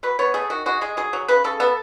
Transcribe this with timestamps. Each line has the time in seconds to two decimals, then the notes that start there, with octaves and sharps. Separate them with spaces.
0.03 F#3 B4
0.19 B3 C#5
0.34 A3 G#4
0.50 D#3 F#4
0.66 G#3 F#4
0.81 G#3 G#4
0.97 F#3 G#4
1.13 F#3
1.28 C#3 B4
1.44 C#3 A4
1.60 B3 A4